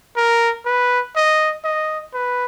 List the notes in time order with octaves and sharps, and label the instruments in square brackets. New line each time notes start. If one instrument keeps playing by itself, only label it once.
[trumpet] A#4
B4
D#5
D#5
B4